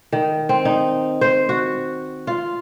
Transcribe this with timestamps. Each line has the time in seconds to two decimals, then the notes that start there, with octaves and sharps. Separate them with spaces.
0.12 D#3
0.49 C4
0.65 D#4
1.21 C5
1.49 F#4
2.27 F4